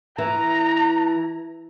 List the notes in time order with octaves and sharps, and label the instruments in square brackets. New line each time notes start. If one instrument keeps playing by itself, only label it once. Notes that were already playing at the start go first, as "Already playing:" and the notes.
[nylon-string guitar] E3 [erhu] A#5